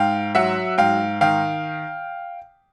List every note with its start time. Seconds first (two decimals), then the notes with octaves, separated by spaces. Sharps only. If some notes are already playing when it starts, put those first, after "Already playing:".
Already playing: G#2 F5 G5
0.35 F#3 E5 F#5
0.78 G#2 F5 G5
1.21 D#3 F5 G5